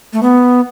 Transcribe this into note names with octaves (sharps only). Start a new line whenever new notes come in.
A3
B3